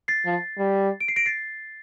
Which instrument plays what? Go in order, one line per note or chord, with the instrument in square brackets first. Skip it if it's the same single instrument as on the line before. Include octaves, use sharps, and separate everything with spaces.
[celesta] A6 C7
[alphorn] F3
G3
[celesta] D7
C7
A#6 D7
A6 C7